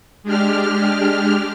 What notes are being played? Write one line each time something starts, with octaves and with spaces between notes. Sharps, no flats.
G#3 D4 G4 F6